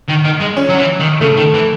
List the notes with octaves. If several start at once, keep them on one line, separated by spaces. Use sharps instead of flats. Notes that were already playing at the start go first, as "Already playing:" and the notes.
D#3
D#3
G#3
C#4
F#3
E3
D#3
C#3 A3
D#3
E3